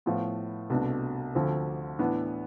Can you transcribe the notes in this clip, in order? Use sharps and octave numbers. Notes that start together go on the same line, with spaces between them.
A2 F3 B3 F4
C2 B2 A3 D4
D2 D3 F3 C4
A2 E3 B3 D4